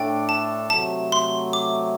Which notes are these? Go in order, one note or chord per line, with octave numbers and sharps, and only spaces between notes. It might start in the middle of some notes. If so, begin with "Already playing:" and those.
Already playing: A2 A3 D4 A4 D5 G5
A5
C3 F#3 A3 A5
C6
D6